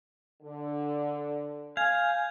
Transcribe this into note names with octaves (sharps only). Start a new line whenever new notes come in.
D3
F5 G#5 G6 G#6